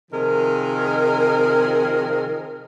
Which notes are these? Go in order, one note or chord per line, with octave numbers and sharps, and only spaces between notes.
C3 D#3 F3 G#4 A#4